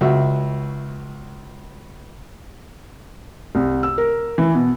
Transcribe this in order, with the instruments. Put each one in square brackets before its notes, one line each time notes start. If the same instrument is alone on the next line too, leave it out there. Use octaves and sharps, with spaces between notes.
[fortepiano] C#2 F#4 E5
[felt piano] C2
E6
A#4
E3
B2